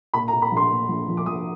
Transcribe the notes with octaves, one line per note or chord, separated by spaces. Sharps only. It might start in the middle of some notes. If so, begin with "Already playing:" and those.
A#2 B5
A#5
A#2
B5
A#1
C6
A#2
A#1
F3
D6
A#1 D#6